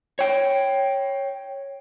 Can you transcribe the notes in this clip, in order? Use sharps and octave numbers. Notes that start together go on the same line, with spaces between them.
C#5 G5